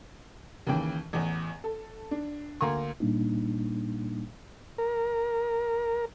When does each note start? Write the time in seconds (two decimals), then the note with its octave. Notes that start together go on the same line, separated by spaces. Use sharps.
0.67 D#2 C#3 E3 G5
1.13 A1 E2
1.64 A4
2.11 D4
2.61 D2 A#3 A#5 C6
3.00 A#2 G3 A#3 D4 D#4
4.78 A#4